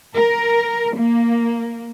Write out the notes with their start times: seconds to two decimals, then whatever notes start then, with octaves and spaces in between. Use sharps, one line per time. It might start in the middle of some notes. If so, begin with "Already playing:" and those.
0.15 A#4
0.96 A#3